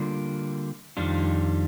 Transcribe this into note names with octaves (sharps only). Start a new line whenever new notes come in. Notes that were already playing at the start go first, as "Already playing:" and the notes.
Already playing: D3 G3 A#3 F4
F2 D#3 G3 D4 F4